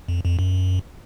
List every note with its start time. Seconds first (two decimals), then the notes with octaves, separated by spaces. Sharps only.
0.08 F2
0.24 F2
0.39 F#2